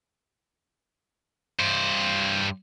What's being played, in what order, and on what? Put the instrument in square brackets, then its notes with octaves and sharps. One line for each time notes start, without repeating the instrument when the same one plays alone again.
[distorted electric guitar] G2 C5